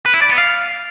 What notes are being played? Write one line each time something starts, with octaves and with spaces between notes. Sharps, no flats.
B4
E4
D5
B3
F5